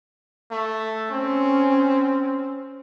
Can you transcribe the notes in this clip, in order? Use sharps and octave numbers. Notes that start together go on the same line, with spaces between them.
A3
C4 C#4